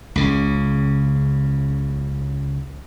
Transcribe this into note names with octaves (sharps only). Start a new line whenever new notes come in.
C#2 C#3